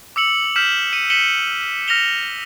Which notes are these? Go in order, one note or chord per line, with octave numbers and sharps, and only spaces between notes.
D6 E6 C#7 F#7
F6 G6 B6 E7 F#7
C#7 D#7
B6 C#7 D#7 E7 F#7 G7
F6 A#6 C#7 F7 G7